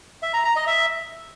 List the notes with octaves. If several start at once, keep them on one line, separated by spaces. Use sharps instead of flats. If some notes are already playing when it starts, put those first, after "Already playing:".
E5
A#5
A#5
D#5
E5